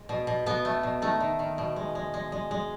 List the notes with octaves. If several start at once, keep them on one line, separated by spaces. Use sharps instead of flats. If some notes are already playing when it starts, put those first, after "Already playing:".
Already playing: G#3
B2
B2
B2 B3
A3
B2
D#3 A3
D#3
D#3
B2
G#3
G#3
G#3
G#3
G#3